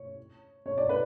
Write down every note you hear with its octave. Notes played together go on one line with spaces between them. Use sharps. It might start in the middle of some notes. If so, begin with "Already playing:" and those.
Already playing: C#5
C#5
D5
B4